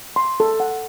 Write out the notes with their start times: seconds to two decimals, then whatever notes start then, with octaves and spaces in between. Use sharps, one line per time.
0.16 C6
0.40 A4
0.60 F#5